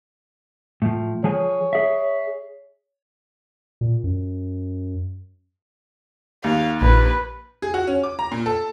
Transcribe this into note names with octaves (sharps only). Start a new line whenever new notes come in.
A2 F3
F3 G#4 C#5 G#5
G#4 E5
A#2
F#2
D#2 F5
A#1 B4
G#4
F#4
C#4
D6
A#5
A#2
A4